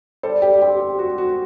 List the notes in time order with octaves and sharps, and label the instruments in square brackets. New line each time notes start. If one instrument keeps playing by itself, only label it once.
[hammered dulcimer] G3 [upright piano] A4 C5
[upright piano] G4
[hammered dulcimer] C4 [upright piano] G4
[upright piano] G4
[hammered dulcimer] C4 [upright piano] F#4
[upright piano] F#4